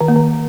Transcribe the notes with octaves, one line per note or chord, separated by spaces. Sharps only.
D#3
A#3
D#3